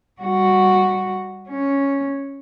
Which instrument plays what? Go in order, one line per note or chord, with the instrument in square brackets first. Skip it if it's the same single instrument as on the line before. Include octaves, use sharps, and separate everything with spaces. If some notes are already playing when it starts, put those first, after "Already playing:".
[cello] G3 F#4
C#4